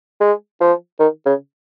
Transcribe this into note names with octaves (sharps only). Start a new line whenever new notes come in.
G#3
F3
D#3
C#3